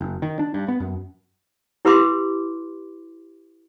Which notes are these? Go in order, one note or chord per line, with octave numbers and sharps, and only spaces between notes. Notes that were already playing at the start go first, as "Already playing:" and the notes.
F#1
D#3
D4
G2
B3
F#2
E4 G4 B4 B5 C6 D6